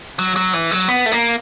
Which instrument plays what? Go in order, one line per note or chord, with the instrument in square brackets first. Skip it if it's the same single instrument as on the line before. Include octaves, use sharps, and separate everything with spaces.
[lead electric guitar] F#3
F#3
E3
F#3
B3
A3
A#3